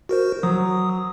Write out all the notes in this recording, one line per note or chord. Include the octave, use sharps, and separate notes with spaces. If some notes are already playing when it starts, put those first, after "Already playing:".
F#4 A#4 C5
F#3 D#6